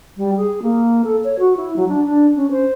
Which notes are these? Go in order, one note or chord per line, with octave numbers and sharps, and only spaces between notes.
G3
G#4
A#3
A4
C#5
F#4
E4
F#3
D4
D4
C#4
C5